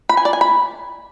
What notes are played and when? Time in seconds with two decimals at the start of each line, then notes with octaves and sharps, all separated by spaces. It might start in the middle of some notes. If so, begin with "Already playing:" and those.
0.09 B5
0.17 G#5
0.25 D5
0.33 G#5
0.41 B5